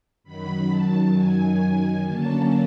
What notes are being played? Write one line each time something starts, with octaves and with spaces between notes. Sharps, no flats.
F#2 D#3 F#3 B5
A5
G#5
D3 F#3 A#3 C#4 A5